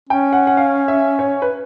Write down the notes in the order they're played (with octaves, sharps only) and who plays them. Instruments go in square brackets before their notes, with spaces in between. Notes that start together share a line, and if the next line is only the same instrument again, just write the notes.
[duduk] C#4 [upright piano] G5
[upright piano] F#5
F#5
F5
E5
C#5
B4